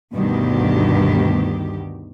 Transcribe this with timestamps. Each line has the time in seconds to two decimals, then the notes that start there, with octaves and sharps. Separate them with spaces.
0.15 D2 G2 B2 D#3 G4